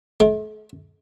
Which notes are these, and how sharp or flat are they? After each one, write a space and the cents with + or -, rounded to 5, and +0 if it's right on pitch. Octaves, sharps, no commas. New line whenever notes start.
A3 -45